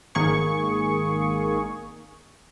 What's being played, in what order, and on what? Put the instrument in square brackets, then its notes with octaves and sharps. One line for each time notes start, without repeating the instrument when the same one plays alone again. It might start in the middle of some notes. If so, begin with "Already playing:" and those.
[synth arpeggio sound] G#1 D#3 A#3 G#4 C#6